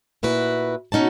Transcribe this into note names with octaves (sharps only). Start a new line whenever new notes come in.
A#2 E4 F#4 B4
B2 C#4 D#4 F#4 A5